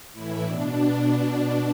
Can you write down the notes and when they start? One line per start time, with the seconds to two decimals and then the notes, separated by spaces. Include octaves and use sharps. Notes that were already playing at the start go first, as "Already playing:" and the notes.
0.13 A2 E3 E4
0.43 B2 D4
0.72 B2 D4